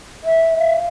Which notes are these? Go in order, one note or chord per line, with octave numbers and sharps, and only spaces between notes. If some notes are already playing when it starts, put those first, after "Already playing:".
E5
F5